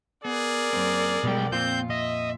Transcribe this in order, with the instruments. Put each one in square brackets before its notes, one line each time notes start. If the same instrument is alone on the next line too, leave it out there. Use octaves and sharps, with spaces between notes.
[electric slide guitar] B3 [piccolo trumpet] G#4 [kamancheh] A#4 D5
[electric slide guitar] F#2 A#3 C4
[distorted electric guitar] B1 G5 [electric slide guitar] B2 G3 G#3
[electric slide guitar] F2 A#2 F4 [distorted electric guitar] C4 [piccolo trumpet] G6
[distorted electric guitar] D#5 [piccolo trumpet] E5